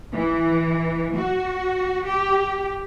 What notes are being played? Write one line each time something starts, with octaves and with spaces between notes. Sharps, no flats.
E3
F#4
G4